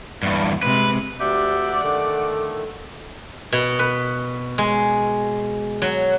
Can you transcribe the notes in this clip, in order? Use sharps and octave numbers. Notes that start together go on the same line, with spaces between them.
E2 G2
C3 G#3 C4 B4
D2 G4 D5 E5 F#5 G6
D3 D#3 A3 A4
B2
B4
G#3
F#3